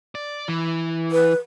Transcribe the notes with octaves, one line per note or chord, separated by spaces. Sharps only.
D5
E3
B4